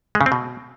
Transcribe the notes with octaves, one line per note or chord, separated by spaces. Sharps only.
G#3
C#3
C4
B2